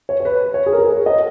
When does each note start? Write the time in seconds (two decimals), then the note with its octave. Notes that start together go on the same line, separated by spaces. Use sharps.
0.09 C#5
0.20 C#5
0.25 B4
0.54 C#5
0.66 G#4
0.73 A#4
0.78 G#4
0.90 C#5
1.06 D#5